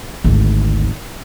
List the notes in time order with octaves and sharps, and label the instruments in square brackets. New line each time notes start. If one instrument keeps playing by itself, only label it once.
[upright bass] G#1 D2